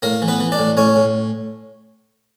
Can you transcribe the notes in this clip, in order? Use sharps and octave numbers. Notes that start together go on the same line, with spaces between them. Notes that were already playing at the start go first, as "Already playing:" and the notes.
A2 A#3 A#4
E3
B3 B4
E3
D4 D5
A2
A2 C#4 C#5
A2